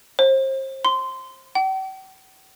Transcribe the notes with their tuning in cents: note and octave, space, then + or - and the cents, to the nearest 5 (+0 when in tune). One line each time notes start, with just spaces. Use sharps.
C5 +35
C6 -15
G5 -45